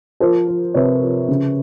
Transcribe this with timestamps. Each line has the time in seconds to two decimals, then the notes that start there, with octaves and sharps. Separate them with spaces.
0.20 F3 A#4 C5
0.48 F3
0.74 C3 B4 C#5
1.02 F3
1.28 C#3